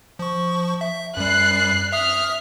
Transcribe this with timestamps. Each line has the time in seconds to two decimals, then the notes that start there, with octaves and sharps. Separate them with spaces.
0.19 F3 C#6
0.81 E5
1.17 F#2 G3 F#6 C7
1.92 E5 D#6 F6